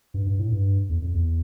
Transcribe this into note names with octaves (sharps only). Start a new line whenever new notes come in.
G2
G2
A2
G2
E2
F2
E2